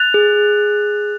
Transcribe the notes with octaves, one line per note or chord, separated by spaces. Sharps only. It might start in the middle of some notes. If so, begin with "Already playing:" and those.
Already playing: F#6 A6 F7
G#4